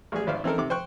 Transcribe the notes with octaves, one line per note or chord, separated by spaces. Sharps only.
A1 G3 G#3 G#4
G#1 D5 E5 F5
E3 C4 D#4 A4 A#4
C3 D#3 D6
C5 G5 C#6 F#6